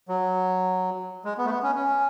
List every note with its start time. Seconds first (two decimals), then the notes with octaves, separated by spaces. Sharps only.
0.09 F#3
1.25 G#3
1.38 B3
1.46 A3
1.50 B3
1.63 C#4
1.75 C#4